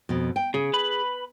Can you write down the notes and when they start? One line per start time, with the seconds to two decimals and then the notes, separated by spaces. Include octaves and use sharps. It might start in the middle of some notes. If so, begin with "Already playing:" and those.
0.09 F2 B2
0.36 G5
0.54 C#3 G#4
0.73 B4 B5